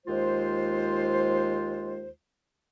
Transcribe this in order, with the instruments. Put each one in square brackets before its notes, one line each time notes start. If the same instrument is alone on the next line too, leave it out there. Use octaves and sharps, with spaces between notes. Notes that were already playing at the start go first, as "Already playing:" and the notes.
[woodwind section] D#2 G#3 F4 C5